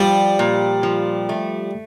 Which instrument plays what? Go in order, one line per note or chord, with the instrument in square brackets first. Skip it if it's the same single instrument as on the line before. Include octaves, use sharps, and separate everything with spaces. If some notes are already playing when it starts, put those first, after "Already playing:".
Already playing: [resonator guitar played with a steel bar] F3 [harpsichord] G3
[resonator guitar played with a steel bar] A#2
F3
A3